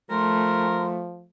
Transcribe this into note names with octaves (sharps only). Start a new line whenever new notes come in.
F3 A3 A#4 C6